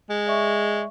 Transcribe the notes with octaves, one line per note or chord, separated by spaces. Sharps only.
G#3
D5 E5 C#6